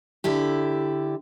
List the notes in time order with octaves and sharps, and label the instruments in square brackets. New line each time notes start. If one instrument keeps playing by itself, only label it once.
[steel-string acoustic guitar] D3 E4 G4